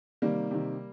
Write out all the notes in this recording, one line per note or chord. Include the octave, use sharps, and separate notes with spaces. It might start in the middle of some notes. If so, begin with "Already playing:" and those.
C3 D#3 G3 A#3
C3 D#3